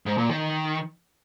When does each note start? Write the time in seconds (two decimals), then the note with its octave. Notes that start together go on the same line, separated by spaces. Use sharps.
0.06 G#2
0.18 A#2
0.30 D#3